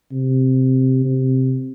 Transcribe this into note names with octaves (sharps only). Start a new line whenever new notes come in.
C3
C3